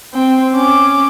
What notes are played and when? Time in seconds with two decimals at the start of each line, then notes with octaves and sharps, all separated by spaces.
0.14 C4 G5
0.55 C#4 D6